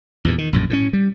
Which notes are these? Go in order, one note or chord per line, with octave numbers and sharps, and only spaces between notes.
E2 G2 A#2
D#3
A#1 F#2 A2
A2 E3 C#4
G3